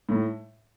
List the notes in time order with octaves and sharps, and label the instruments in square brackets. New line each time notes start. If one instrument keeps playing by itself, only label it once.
[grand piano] A2